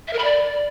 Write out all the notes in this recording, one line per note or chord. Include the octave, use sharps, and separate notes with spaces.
E5
A#4
B5
D5